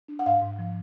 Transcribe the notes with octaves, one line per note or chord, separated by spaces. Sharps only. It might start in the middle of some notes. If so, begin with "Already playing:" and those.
D4
F#5
G#2 F5
G#2
F3